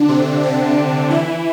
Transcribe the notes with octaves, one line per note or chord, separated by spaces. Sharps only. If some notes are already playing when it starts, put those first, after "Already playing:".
Already playing: D3 D4
C3 C4
D3 D4
E3 E4